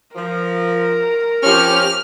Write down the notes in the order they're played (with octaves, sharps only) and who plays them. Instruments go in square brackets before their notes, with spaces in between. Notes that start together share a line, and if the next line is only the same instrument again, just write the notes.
[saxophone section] F3 [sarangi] A#4
[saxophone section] F3 C#4 [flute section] G4 [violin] F6